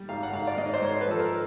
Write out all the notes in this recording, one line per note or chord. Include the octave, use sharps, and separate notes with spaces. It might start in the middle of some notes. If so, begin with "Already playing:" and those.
Already playing: G3
G#1 F5
F#5
G#1 F5
D5
G#2 D#5
C5
G#1 C#5
B4
F3 A4
A#4